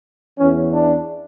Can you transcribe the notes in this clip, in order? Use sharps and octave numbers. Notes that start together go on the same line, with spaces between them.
E2 E3 C#4
D4